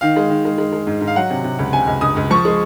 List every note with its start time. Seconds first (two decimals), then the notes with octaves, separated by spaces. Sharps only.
0.01 D#3 F5
0.16 G#3
0.30 D#3
0.45 G#3
0.58 G#3
0.72 G#3
0.87 G#2
1.01 G#2
1.07 F5
1.16 F#3 F#5
1.30 C3
1.44 C3
1.59 C#2
1.73 C3 G#5
1.87 C#2
2.01 C#2 D#6
2.16 C#2
2.31 F3 C#6
2.45 G#3